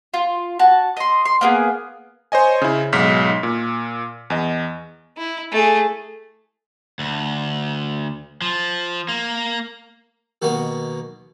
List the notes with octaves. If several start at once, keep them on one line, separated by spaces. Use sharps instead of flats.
F4
F#4 A5
D#5 C6
C6
A#3 B3 G#4
C5 C#5 D#5 G#5
C#3 E4
B1 G#2 F6 B6
A#2
E2 D#5
E4
A3 G#4
D2
F3
A#3
B2 D#3 A#3 F#4